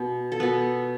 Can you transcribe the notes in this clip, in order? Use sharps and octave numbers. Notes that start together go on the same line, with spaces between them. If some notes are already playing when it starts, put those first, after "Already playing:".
Already playing: B2 B3
A4
B2 B3 B4